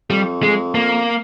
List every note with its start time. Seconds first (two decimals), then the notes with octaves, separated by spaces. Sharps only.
0.10 F2 G3
0.43 G#3
0.75 A#3